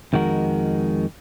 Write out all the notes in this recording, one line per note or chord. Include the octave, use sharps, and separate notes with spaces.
F2 D#3 G#3 F#4 A#4